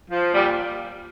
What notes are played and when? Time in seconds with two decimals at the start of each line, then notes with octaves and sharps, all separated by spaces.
0.10 F3
0.34 A#2 G3